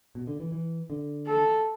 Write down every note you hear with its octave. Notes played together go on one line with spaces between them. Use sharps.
B2
D3
E3
E3
D3
A4